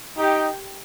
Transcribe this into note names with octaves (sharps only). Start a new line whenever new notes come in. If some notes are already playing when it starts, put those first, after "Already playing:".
D#4 G4